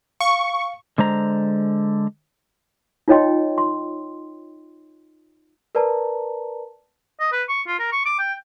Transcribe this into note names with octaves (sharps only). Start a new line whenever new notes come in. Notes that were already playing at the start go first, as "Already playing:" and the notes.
F5 C#6
D3 G#3 C5 A#5
D#4 F4 C#5 D#5 G5 C6
C6
A#4 B4 D5 A5 A#5
D#5
B4
C#6
F4
A#4
C#6
D6
G5